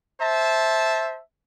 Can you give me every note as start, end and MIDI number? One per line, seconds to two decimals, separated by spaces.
0.19 1.18 72
0.19 1.18 76
0.19 1.18 81